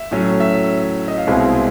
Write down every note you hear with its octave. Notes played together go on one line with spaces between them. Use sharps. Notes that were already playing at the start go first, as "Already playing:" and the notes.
Already playing: E5
A2 F#3 A3 C#4
E5
D#5
F5
C2 B2 G#3 C4 E4